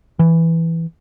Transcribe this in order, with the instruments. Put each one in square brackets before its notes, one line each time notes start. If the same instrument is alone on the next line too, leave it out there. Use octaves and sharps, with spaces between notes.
[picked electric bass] E3